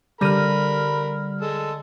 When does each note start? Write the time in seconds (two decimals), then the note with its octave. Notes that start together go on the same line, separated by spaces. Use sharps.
0.21 D3 G3 A#4 B5 F6 A#6 D#7
1.42 G#3 A4